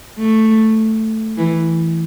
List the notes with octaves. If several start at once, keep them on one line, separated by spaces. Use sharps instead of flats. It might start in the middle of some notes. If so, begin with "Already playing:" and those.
A3
E3